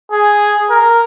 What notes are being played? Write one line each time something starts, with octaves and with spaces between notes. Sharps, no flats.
G#4
A#4